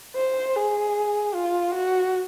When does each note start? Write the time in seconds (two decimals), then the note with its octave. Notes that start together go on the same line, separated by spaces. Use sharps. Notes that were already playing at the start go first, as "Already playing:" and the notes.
0.16 C5
0.56 G#4
1.35 F4
1.74 F#4